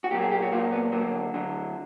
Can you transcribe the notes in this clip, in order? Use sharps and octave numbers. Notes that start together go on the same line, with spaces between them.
F#4
A#2 F#3 A#3 G4
G#4
G4
F#4
A#2 F#3 A#3 F4
B3
D2 D3 F#3 A#3
D2 D3 F#3